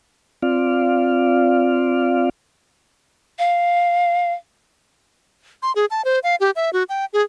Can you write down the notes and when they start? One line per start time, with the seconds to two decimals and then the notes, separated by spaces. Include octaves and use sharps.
0.42 C4 F4 D5 F5
3.39 F5
5.62 C6
5.76 G#4
5.91 A5
6.05 C5
6.23 F5
6.40 G4
6.56 E5
6.73 F#4
6.89 G5
7.13 G#4